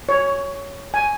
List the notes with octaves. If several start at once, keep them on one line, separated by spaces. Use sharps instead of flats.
C#5
G#5